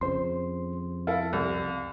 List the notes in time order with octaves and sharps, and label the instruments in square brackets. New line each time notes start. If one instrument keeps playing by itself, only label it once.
[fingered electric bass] F2 C#3 [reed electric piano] C5 C6
[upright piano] E4 A4 [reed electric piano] F5
[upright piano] C2